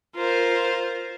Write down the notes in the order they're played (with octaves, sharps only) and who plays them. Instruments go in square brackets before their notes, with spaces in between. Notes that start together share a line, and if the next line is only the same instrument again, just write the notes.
[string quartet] F4 A#4 C5